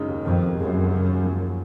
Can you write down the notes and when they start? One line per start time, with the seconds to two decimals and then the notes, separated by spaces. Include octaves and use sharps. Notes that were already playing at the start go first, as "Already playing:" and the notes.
Already playing: F#2 C#3 G#3 D#4
0.08 D#2
0.25 F2 D#3
0.42 C3
0.58 F#2 G#3
0.75 C#2
0.91 C#3
1.08 D#2
1.24 F3